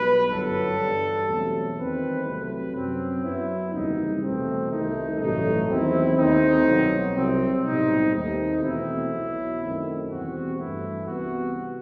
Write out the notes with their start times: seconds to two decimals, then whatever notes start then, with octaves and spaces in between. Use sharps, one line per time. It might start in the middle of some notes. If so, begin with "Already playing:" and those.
Already playing: B1 B2 G3 B4
0.29 G1 F#2 F#3 A4
0.79 G2 E3 G3
1.28 E2 B2 F#3 A3 C4
1.77 E2 D#3 G3 C4 B4
2.26 C2 C3 F#3 A3 C4 B4
2.74 F#2 F#3 C4
3.24 F#2 F#3 B3 E4
3.72 F#1 E2 C3 D#3 G3 D#4
4.22 E2 B2 A3 C4
4.71 C2 C3 D#3 A3 D#4
5.19 A1 G2 F#3 A3 D#4
5.68 E2 D#3 F#3 C4 E4
6.18 D#2 D#3 A3 C4 D#4
6.67 C2 B2 F#3
7.16 C2 C3 F#3 C4
7.64 B1 A2 G3 C4 D#4
8.14 D#2 D#3 A3 C4 D#4
8.62 E2 B2 A3 C4 E4
9.11 B1 B2 F#3
9.60 F#2 D#3 A3 C4
10.10 E2 B2 G3 C4 F#4
10.59 G2 E3 A3 E4
11.07 C2 C3 E3 B3 F#4